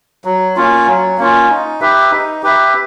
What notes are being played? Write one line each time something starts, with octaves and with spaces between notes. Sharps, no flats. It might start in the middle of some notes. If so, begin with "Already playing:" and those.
F#3
A#3 C#4 F4
F#3
A#3 C#4 F4
D#4
G4 B4 E5
D#4
G4 B4 E5